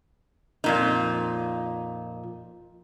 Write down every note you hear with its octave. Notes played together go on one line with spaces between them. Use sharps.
F2 A#2 D#4